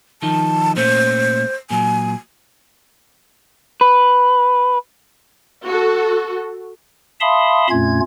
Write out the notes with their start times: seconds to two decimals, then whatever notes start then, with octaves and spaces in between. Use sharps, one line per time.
0.22 D#3 F3 D#4 A5
0.76 A#2 A3 C#4 C5
1.70 A#2 F#3 G#5
3.81 B4
5.66 F#4 A4
7.21 E5 F5 A5 B5 C6 D#6
7.70 F2 A#2 A3 C#4 F4 G#6